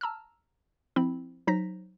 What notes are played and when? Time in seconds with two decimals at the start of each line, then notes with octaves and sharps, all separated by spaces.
0.01 A5 A#5 E6 F6
0.96 F3 C4 E4 B5
1.47 F#3 D#4 C5 A#5 A#6 B6